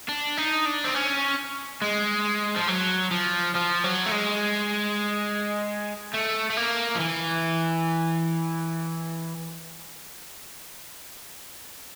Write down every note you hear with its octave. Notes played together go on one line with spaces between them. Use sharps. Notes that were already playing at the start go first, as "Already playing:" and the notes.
D4
D#4
D4
C4
C#4
G#3
F3
F#3
F3
F3
F#3
A3
G#3
A3
A3
A#3
F3
E3